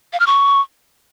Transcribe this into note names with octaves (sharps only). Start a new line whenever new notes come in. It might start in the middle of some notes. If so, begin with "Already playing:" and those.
F5
F6
C#6